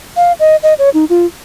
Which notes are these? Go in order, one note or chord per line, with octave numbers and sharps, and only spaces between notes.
F5
D#5
D#5
C#5
D#4
F4